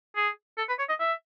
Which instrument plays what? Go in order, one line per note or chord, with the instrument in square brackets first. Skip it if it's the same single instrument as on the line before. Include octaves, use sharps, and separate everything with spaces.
[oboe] G#4
A4
B4
C#5
D#5
E5